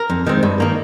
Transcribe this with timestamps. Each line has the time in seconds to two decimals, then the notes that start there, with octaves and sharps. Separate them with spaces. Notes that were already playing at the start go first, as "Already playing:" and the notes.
Already playing: A#4
0.10 F2
0.27 D#3 G#3 C4
0.43 G2
0.60 D#3 A#3